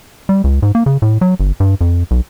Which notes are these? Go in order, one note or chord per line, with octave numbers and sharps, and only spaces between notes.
G3
C#2
G#2
A#3
C#3
A2
F#3
G1
G2
F2
B1